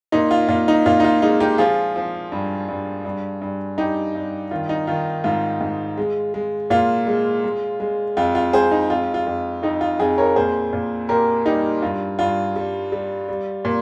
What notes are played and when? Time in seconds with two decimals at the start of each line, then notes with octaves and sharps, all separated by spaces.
0.12 A#2 D#4
0.31 F4
0.48 A#2 F4
0.68 D#4
0.86 A#2 F4
1.00 D#4
1.04 F4
1.22 G#3 D#4
1.40 D#4 G4
1.58 F3 F4 G#4
1.96 F3
2.32 G2
2.68 G2
3.05 G2
3.42 G2
3.78 G2 D#4 G4
4.15 G2
4.51 D#3 F4
4.69 D#4
4.87 D#3 F4
5.24 G#2 F4
5.61 G#2
5.97 G#3
6.34 G#3
6.70 A#2 F4
7.07 G#3
7.44 G#3
7.80 G#3
8.17 F2 F4
8.35 F4
8.53 G#3 G#4 C5
8.71 D#4
8.90 F2 F4
9.14 F4
9.26 F2
9.63 F2 D#4
9.81 F4
9.99 F2 F4 G#4
10.18 A#4 C#5
10.36 A#2 G#4 C5
10.73 A#2
11.09 A#2 G4 A#4
11.46 G3 D#4 G4
11.82 G2 F4
12.19 G2 F4
12.56 G3
12.92 G3
13.28 G3
13.65 A#2